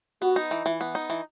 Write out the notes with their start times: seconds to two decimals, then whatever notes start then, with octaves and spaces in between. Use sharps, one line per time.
0.22 B3 F#4
0.36 D#4
0.51 E3
0.65 E3 E4
0.81 B3
0.95 D#4
1.10 E3